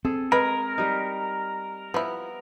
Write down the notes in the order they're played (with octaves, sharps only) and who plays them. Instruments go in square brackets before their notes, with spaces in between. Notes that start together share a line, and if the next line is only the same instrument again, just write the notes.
[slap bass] C4 [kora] G#4 A4
[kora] G#3 G#4 [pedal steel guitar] A#4 [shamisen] B4
[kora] G3 D#4
[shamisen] F3 E4 [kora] B3